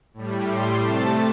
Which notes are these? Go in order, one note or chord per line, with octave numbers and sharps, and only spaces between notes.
A2 G3
A2 G3 C6
C3 A3 A5